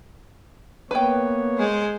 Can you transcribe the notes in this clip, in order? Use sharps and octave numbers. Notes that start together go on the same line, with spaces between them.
A#3 B3 B4 C#5 G5
G#3 C5